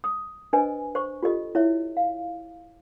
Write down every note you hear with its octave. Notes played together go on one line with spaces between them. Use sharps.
D#6
D4 B4 C5 D#5 G#5
C5 C#6
F4 G4 A4 D#5
E4 C#5 E5
F5